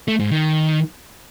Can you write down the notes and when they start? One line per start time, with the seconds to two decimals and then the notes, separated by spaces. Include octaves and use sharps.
0.08 A3
0.19 G#2
0.31 D#3